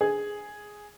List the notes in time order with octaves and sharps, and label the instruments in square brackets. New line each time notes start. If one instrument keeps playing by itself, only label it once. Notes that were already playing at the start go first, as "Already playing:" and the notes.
[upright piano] G#4